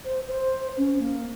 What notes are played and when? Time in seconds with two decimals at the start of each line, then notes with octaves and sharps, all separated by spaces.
0.05 C5
0.28 C5
0.77 C#4
0.99 A#3